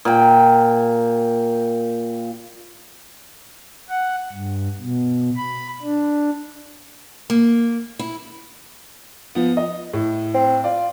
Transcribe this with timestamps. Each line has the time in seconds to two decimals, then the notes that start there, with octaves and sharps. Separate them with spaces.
0.05 A#2 G5
3.89 F#5
4.32 G2
4.80 B2
5.37 B5
5.82 D4
7.30 A#3
7.99 E4
9.35 F3 B3
9.57 D#5
9.93 A2
10.34 C4
10.64 F4 D5